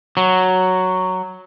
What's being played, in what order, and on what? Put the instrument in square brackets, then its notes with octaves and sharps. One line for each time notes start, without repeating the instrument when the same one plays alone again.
[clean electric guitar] F#3